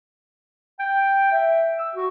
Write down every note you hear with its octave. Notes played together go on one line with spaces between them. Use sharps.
G5
E5
E6
F#4